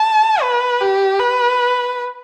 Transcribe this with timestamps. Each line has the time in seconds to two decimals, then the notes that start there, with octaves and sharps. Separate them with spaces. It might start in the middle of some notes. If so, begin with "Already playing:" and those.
Already playing: A5
0.42 B4
0.81 G4
1.19 B4